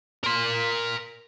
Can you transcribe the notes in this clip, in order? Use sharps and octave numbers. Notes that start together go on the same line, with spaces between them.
A#4 C6